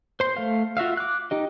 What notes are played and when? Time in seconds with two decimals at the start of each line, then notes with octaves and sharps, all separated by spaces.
0.20 C5 C6
0.37 A3 F5
0.77 F4 F#4 E5 F5
0.97 D6 F#6
1.31 D#4 G4 D#5